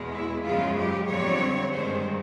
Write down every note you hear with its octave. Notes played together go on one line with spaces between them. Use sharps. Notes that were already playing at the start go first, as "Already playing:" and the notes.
Already playing: E2 B2 G#3
E4
F#2 C#3 F3 G#3 F4
G4
F2 D3 G3 C4 C#5
G2 D#3 G#3 C5